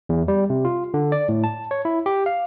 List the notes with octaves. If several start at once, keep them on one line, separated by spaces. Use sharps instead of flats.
E2
G3
C3
F4
D3
D5
A2
A5
C#5
E4
G4
F5